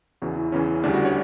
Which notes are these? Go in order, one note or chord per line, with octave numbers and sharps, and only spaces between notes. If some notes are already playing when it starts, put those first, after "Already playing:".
E2 C#3 E3 F#4
E4
E2 C#3 E3 C#4
D2 C#3 G3 D4
F#4
C#5